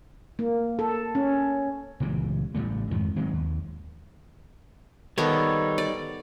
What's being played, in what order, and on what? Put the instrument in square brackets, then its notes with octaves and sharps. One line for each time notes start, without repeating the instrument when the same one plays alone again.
[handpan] A#3
A4
C#4
[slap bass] C#2 A#2 E3 G3
A1 D3 G3 A3
F2 G#2 D#3 F3
D#3 F#3 G#3 C4
D#2
[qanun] D#3 B3 A4 [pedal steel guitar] G3 D#4 C#5
[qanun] D5